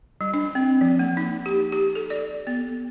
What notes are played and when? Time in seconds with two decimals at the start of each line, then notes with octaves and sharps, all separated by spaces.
0.21 G3
0.34 D4
0.55 C4
0.81 F3
0.99 A#3
1.17 D#4
1.46 G4
1.72 G4
1.95 A4
2.10 D5
2.47 B3